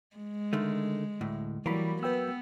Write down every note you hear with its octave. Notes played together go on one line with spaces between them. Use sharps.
G#3
D3 D#3 A3
D2 A2
E3 F#3 G3 A#3 B5
B3 B4 G5 E6